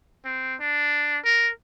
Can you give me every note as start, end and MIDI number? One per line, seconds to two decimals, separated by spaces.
0.25 0.55 60
0.60 1.18 62
1.25 1.50 70